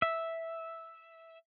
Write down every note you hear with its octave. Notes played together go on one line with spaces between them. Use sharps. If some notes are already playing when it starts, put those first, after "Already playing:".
E5